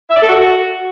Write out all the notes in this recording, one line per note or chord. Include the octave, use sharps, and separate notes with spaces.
E5
D5
A4
F#4